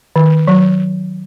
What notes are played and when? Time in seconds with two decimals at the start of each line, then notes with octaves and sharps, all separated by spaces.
0.16 D#3
0.47 F#3